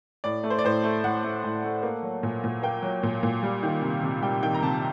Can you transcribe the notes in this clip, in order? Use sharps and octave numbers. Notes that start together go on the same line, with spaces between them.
A2 D5
A3
C5
D5
A2 C5
A3
A2 F#5
A3
A2
A3
A#3
F#3
A#2
A#2
A#3 G5
F#3
A#2
A#2
G3
D#3
C3
C3
G3 G5
D#3 G5
A#5
C3 A5